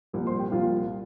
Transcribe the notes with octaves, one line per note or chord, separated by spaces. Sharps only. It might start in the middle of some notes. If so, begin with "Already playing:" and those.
C2 A#2 F3
C5 C6
G4 G5
C2 A#2 F3 F4 F5